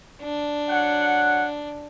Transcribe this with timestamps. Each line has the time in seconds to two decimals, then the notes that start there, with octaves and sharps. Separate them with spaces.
0.22 D4
0.70 F#3 C#5 F#5